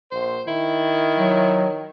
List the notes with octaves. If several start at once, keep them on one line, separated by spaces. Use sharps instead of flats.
A#1 C5
D#3 E4
F#3